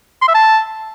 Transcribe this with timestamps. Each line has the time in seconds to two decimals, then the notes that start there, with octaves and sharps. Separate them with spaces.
0.22 C6
0.28 E5
0.34 A5